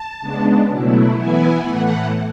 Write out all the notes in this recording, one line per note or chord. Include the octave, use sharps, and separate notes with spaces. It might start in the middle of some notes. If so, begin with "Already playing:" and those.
Already playing: A5
C#3 G#3 B3 D4
B2 F#3 A3 E4
E3 B3 E4 G#5
A2 E3 A3 F#5